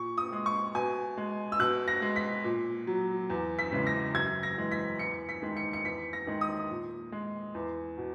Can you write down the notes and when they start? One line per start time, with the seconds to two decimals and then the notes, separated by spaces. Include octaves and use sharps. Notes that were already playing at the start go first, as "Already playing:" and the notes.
Already playing: A#2 C#6
0.18 D#6
0.32 G#3
0.46 C#6
0.75 B2 G#5
1.17 G#3
1.52 E6
1.59 B2 F#6
1.88 A#6
2.02 G#3
2.16 B6
2.44 A#2
2.87 F#3
3.30 E2
3.59 B6
3.72 C#3 E3 G#3
3.87 A#6
4.15 F#2 G#6
4.43 A#6
4.57 E3 G#3
4.71 B6
4.99 E2 C#7
5.29 B6
5.42 D#3 G#3
5.57 C#7
5.73 C#7
5.84 E2 B6
6.13 A#6
6.27 D#3 G#3
6.41 D#6
6.70 A#2
7.12 G#3
7.55 E2
7.98 B2